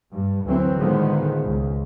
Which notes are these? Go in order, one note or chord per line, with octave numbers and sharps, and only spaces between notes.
G2
D2 E3 F#3 C4
A2 D3 D#3 F3 G#3 B3
C#2